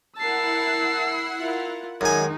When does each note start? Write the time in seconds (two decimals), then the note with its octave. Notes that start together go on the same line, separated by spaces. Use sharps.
0.18 E4 A#4 F#5 A5 E6 C7
1.39 F4 A#4
2.01 F#2 D#3 G#3 D#4 G#4 G#5